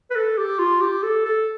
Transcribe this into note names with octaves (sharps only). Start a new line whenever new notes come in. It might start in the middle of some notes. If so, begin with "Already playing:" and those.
B4
A4
G4
F4
G4
A4
A4